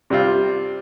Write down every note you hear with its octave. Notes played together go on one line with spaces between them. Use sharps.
C3 G3 C4 F4